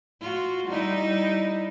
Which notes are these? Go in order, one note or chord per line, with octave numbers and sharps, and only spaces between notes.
F4 F#4
G3 D#4 E4